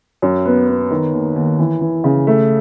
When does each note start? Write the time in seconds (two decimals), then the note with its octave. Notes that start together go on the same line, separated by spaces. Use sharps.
0.22 F#2
0.45 B3
0.67 B3
0.90 D#3
1.13 D#2
1.36 D#2
1.59 E3
1.81 E3
2.04 C#3
2.27 A3